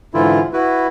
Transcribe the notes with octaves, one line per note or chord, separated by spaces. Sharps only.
G#2 D3 E3 E4 F4
E4 F#4 B4